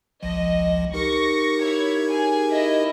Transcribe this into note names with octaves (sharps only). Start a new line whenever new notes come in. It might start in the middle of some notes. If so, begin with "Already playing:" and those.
G#1 C#2 F3 D#5
D#4 G4 A#4 C#6 A#6
E4 C#5 G#6
G#4 G#5
E4 D#5